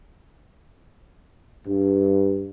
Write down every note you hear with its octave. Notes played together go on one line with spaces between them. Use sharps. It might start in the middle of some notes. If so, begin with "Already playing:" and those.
G2